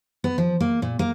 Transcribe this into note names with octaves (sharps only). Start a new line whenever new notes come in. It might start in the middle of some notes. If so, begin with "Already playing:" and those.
B3
F3
A#3
A#2
A#3